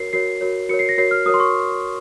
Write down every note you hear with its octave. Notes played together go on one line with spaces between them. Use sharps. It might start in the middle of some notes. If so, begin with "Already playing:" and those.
Already playing: F#4 A#4 C#5 C7
F#4 A#4 C#5 C7
F#4 A#4 C#5
F#4 A#4 C#5 C#7
C7
A#6
F#4 A#4 C#5 C7
F6
F#4 A#4 C#5 D#6
C6
C#6